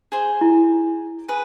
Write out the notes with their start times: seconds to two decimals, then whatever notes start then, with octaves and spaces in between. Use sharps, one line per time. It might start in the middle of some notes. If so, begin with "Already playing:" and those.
0.12 G#4 C5 G#5
0.41 E4
1.28 G#4 B4